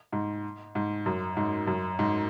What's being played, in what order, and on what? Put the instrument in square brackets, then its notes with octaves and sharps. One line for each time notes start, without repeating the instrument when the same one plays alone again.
[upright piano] G#2
G#2
F#2
G#2
F#2
G#2